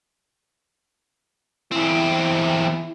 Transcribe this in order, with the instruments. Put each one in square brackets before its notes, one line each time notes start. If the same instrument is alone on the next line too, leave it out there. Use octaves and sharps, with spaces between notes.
[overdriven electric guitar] E2 C4 [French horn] E4